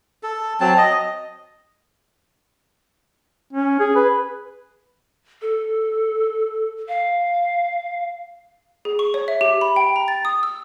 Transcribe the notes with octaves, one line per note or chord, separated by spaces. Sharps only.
A4
F#3 C4 A5
D#5
C#4
G#4
B4
A4
F5
G#4
C#6
C#5
E5
G4
B5
G5
A#5
A6
D#6
E6